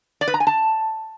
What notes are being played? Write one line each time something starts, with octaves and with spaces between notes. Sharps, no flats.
D5
B4
A#5
G#5
A5